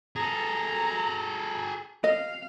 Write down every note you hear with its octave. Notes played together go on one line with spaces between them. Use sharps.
G#4 A4 A#5
D#5 F5